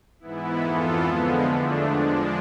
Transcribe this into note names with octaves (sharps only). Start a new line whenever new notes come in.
G#2 E3 B3 E4
F2 E3 B3 F4 A4
D3 F3 G#3 B3
E2 D3 A3 D4
F3 G#3 D4